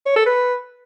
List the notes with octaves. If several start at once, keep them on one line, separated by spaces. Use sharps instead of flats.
C#5
A4
B4